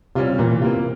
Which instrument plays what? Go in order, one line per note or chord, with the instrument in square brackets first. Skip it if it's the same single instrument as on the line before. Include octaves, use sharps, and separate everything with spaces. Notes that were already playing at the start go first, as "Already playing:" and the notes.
[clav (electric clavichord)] C3 [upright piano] G3 C#4 F4
[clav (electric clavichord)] A#2 [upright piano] E3
[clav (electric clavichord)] C3 [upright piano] A#3 F4